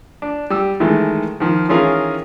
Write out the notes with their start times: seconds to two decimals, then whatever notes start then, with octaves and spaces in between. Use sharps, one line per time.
0.22 D4
0.50 G3 E6
0.80 D#3 E3 G#3 A3
1.40 D#3 F3
1.69 D#3 E3 C#4 F4 G#4 A#4